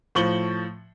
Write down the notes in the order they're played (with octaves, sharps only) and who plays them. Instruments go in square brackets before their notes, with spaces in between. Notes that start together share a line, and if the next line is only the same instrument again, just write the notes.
[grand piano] A2 F3 C#6 F#7 G7